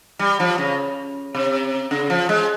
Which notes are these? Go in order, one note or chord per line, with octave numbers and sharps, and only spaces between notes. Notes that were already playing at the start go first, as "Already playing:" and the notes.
G3
F3
C#3
C3
C#3
F3
G#3